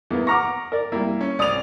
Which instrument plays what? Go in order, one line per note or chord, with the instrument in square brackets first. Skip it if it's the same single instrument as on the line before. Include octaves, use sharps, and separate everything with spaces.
[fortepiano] E2 [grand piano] E3 A#3 B3
[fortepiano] F#5 A#5 C#6 [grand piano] D6 F6 A#6
[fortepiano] A#4 D5
[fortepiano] G3 A#3 [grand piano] E4
[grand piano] C#4
[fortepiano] C2 D#6 [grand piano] D5 F7